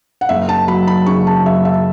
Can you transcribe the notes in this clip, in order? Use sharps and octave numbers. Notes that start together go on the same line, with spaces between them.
F#5
F#1 E5
A5
F#3 B5
B5
C#3 C#6
A5
F#2 E5
E5